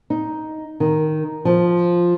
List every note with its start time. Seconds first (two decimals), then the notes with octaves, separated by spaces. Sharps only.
0.10 D#4
0.80 D#3
1.45 F3